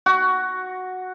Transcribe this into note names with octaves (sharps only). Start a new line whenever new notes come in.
F#4